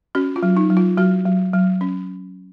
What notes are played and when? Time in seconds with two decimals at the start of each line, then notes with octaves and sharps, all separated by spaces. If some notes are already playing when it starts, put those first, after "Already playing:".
0.15 C#4 F#4
0.36 F4
0.43 F#3
0.57 D#4
0.70 F#3
0.77 F4
0.98 F#3 F#4
1.26 F#3
1.54 F#3
1.81 C#4